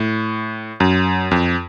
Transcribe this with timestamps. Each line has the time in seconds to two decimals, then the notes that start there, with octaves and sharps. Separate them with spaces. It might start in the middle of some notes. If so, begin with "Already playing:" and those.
Already playing: A2
0.80 F#2
1.31 F2